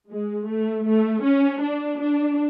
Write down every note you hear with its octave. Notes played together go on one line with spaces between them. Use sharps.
G#3
A3
A3
C#4
D4
D4